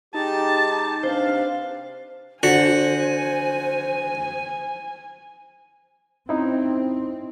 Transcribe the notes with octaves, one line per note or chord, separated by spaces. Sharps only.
G#3 D#4 G4 A5
C3 D4 B4 C5 F5
D3 F#4 C5 G#5
C4 C#4 D#4 E4